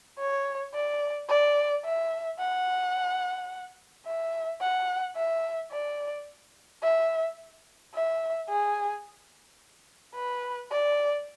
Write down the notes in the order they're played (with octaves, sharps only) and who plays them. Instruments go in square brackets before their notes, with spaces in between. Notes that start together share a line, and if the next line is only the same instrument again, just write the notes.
[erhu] C#5
D5
D5
E5
F#5
E5
F#5
E5
D5
E5
E5
G#4
B4
D5